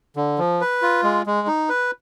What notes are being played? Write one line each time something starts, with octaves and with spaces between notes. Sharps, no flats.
D3
F3
B4
F4
G#3
G#3
D#4
B4